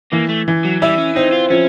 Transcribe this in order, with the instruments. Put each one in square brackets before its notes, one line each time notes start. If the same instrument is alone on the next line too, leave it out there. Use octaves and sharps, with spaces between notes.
[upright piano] E3 [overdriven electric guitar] A#3
[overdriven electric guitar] A3
[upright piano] E3
[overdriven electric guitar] F#3
[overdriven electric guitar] G3 [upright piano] E4
[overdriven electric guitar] C#4
[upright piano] C4 [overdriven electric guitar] D#4
[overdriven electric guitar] F4
[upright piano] F3 [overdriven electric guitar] C#4